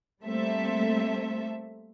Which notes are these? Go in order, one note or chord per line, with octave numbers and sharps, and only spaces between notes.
G3 A3 A#3 C4 A4 E5